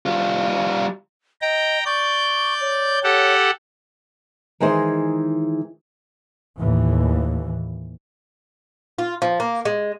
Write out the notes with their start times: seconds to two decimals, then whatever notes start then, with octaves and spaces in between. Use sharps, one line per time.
0.06 G3 F4
1.41 D#5 G5 A#5
1.86 D5 C#6 G6
2.61 C#5
3.04 G4 A4 F#5
4.60 D#3 E3 G#3 D#4 G#4 C5
6.58 D#2 A2 E3
8.99 F4
9.22 F3
9.40 A#3
9.65 G#3